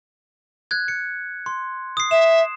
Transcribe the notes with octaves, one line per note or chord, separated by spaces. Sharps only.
F#6 G#6
C#7
C6
D#6 C7
E5 E7